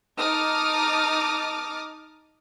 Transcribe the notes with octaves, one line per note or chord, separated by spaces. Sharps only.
D#4 A5 D6 D#6 F6